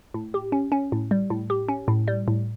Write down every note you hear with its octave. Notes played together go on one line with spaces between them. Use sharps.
A2
G4
C#4
C#4
A2
G3
A2
G4
C#4
A2
G3
A2